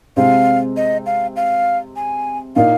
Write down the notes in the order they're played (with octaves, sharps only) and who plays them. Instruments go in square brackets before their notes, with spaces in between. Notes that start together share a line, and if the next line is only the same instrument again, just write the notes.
[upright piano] C3 G#3 C4 [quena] F5
[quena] D#5
F5
F5
G#5
[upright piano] A#2 A#3 D#4 [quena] F5